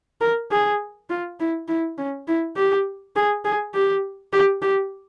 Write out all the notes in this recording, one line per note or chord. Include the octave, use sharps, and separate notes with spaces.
A#4
G#4
F4
E4
E4
C#4
E4
G4
G#4
G#4
G4
G4
G4